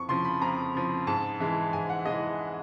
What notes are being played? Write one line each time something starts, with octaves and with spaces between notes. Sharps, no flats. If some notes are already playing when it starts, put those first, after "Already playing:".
Already playing: F2 C#6
C#3 F3 C6
B5
F2 A#5
C#3 F3
G#2 A5
E3 G#3
G#2 G#5
F#5
E3 G#3 D#5